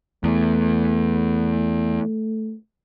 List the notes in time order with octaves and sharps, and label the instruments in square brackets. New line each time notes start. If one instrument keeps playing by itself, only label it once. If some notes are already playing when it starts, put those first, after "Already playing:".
[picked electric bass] E2 [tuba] A3